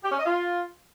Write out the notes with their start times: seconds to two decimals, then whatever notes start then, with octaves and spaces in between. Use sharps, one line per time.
0.03 G4
0.11 C#4
0.18 D#5
0.26 F4